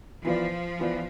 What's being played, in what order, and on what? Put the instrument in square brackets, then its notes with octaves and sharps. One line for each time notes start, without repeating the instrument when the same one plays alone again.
[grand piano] E3 B3 F4 B4 D5 [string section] F3
[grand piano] E3 B3 F4 B4 D5